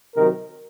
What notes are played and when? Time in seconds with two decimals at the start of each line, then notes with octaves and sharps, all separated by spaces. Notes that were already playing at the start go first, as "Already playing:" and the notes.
0.15 C3 D#3 F#3 A#4